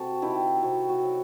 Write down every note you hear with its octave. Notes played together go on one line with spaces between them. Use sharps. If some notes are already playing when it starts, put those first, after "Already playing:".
Already playing: C3 F#4 A4
D#3 E4 G4
C3 F#4
F#4
F#3